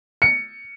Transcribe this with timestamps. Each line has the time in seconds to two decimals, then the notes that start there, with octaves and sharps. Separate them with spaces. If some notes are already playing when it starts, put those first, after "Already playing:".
0.22 C#7